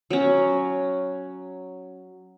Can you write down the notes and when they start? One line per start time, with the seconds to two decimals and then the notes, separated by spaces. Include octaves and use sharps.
0.10 F#3 C#4